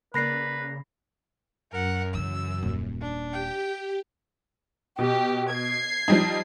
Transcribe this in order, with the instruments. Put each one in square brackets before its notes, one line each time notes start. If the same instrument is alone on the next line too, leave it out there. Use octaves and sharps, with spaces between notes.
[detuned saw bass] C#3 [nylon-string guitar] A#3 D5 [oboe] B4 [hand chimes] B5 A#6 C7
[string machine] F#2 [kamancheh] A#4 F#5
[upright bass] C#3 E3 [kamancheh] E6
[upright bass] D#1
[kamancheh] D4
[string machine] G4 [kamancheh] G5
[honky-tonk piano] B2 [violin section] G4
[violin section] G#6 C7
[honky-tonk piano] F3 G3 D#4